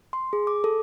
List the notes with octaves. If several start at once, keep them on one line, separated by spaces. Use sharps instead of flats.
C6
G#4
D6
A4